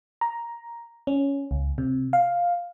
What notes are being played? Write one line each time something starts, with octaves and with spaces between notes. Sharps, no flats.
A#5
C#4
C#2
C3
F5